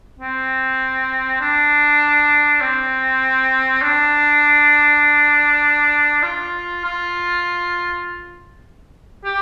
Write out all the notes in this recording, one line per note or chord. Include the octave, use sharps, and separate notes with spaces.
C4
D4
C4
D4
F4
F4
G4